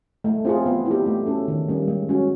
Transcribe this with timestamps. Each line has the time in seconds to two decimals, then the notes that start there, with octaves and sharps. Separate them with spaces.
0.24 A3
0.45 C4 F4 G#4
0.66 B3
0.86 E4
0.91 G4
1.06 A3
1.26 C#4 F#4 A4
1.48 D#3
1.68 G3 A#3 C#4
1.88 G#3
2.09 C#4 F#4